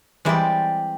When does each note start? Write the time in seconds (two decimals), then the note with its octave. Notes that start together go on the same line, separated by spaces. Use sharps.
0.25 E3 G3 G#3 C4 G4 D5